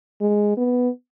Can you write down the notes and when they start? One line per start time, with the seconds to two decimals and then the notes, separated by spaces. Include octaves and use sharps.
0.21 G#3
0.57 B3